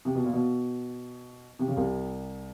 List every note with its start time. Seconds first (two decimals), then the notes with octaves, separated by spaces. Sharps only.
0.05 C3
0.15 B2
0.24 A#2
0.33 B2
1.59 C3
1.68 C#3
1.76 C2 C3